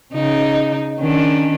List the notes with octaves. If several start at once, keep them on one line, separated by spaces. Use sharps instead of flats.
C#3 D#4
D#3 C#4 D4